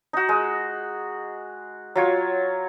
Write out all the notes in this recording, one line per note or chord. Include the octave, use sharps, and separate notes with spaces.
D#4 F#4
G#3
F#3 F4 C#5